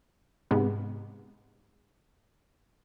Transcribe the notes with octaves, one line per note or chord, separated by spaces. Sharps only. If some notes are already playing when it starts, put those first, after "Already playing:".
G#2 C3 G#3 B3